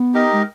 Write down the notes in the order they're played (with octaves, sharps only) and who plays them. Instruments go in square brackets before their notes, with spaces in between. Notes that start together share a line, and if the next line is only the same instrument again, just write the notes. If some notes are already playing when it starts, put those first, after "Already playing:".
Already playing: [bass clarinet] B3
[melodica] D#4 G4 A#4 D#5
[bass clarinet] G#3